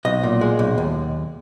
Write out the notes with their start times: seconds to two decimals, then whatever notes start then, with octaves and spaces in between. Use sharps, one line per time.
0.05 B1 D#5
0.23 A#2
0.41 G#3
0.59 B1
0.78 D#2